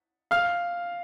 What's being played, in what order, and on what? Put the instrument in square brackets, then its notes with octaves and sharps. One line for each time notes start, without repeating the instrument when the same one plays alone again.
[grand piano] F5 F6